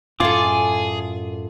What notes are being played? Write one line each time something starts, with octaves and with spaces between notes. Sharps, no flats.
F#2 A2 F4 G#4 A4 D6